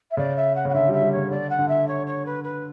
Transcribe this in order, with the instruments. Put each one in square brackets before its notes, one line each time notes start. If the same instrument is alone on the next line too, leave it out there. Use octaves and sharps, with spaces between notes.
[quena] E5
[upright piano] C#3 [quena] D5
[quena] E5
F#5
[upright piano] C#3 [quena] F#5
[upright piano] D3 [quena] E5
[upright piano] G3 [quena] E5
[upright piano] G3
[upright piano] C#3 [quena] C#5
[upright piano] D3 [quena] D5
[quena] F#5
[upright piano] D3
[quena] E5
C#5
C#5
B4
B4